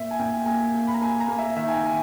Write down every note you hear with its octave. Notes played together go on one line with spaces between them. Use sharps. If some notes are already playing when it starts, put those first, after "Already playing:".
Already playing: A#2 E5
G#5
A#2 G5
A#3 G#5
A#3
B5
A#5
A#3 G#5
A#5
A#3
E5
D#3 E5
G#5
G5
D#3 G#5